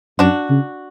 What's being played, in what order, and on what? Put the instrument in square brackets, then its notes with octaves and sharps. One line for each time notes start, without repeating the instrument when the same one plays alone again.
[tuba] F#2 [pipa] D4 F#4
[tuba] C#3